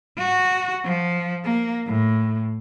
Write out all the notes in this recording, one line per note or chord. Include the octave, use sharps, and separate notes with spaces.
F#4
F3
A#3
A2